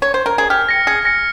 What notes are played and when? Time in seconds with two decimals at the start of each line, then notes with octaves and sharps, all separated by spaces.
0.02 C#5
0.14 C5
0.26 A#4
0.38 G#4
0.50 G4 F6
0.69 A#6 C#7
0.87 G#4 F6
1.05 A#6 C#7